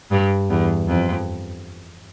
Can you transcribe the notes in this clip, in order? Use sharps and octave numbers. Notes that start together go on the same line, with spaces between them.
G2
E2
F2